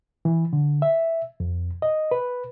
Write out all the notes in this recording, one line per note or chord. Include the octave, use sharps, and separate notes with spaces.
E3
D3
E5
F2
D#5
B4